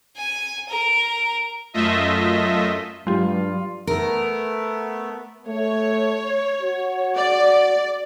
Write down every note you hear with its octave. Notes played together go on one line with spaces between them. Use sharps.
G#5
A#4
F#2 A3 F4 D#5 E5
G2 F#3 G#3 F4 G4
A3 B3 A#4
A3 C#5
F#4
D5